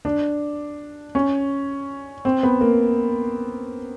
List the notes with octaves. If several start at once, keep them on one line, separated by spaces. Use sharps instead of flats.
D4
C#4
C4
B3
A#3